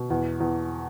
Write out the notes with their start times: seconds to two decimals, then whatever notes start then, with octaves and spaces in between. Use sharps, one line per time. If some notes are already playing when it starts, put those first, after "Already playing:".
Already playing: B2
0.10 E2
0.40 E2